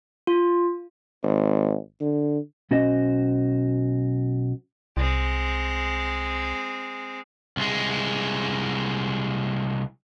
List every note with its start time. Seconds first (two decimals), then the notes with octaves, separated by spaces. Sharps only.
0.27 F4
1.23 G#1
2.01 D3
2.71 B1 C#4 F#4 C5 D#5
4.97 C2 G#3 C4
7.57 C2 G#3